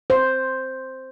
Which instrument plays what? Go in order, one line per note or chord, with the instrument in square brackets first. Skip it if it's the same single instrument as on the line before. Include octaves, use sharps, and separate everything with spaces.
[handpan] C5